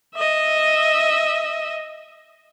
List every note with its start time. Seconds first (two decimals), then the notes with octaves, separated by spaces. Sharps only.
0.15 D#5 E5